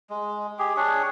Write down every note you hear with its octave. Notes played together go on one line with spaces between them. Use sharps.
G#3
G4 G#4
D4 G#4 C#5